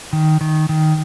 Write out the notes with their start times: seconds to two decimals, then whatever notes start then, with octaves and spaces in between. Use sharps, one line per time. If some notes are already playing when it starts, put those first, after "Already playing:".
0.13 D#3
0.41 D#3
0.69 D#3